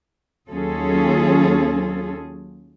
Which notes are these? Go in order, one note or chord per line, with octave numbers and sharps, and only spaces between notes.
D#2 F#3 C#4 F4 G#4 A4